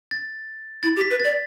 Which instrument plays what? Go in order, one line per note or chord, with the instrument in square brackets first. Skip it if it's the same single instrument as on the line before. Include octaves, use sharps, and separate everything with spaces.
[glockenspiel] A6
[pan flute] E4 [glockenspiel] A6
[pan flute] G4
[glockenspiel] B6
[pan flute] B4
[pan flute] D5 [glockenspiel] A6